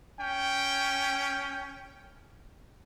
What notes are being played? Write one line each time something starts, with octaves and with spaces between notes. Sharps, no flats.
C#4 G5